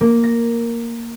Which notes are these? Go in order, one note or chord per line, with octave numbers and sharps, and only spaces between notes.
A#3
A#6